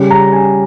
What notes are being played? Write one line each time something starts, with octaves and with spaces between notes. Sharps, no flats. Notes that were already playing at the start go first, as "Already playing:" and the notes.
Already playing: C#3 G3 C#4
A#5
G#5